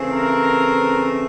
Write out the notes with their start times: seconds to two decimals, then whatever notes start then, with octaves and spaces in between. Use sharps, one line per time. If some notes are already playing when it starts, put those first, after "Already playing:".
Already playing: C#3 E3 A3 C4
0.13 A#4